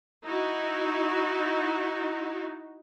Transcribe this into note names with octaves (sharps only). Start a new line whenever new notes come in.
D#4 E4 F#4